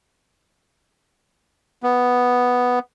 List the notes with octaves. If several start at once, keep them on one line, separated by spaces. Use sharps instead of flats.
B3